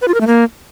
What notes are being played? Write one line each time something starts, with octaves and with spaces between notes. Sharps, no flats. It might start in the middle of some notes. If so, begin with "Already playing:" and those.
B4
F4
A#4
A3
A#3